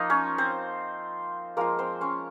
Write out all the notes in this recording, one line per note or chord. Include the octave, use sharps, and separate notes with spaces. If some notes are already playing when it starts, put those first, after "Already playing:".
Already playing: F3 A#3 D#4 F4 D#5
C#4 C#5
C4 C5
F3 G#3 A#3 C4 F4 A#4
C4 C5
C#4 C#5